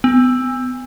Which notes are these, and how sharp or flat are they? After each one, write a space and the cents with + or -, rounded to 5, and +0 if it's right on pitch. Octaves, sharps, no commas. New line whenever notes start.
B3 +35